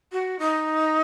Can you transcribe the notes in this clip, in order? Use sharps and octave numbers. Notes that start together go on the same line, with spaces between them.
F#4
D#4